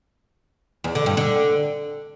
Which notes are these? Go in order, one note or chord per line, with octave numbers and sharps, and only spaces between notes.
E2
D3
G2
D3